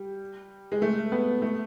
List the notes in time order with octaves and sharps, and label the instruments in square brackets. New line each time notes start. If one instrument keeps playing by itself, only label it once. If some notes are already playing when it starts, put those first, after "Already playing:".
Already playing: [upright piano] G3
G#3
A3
B3
A3